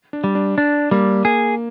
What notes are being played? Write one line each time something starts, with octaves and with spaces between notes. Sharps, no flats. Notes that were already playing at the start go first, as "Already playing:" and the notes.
D4
G3
D4
D4
G3 A#3
A#3 G#4